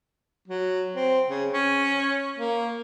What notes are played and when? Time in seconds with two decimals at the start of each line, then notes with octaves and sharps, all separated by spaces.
0.48 F#3
0.96 C4
1.28 C#3
1.53 C#4
2.38 A#3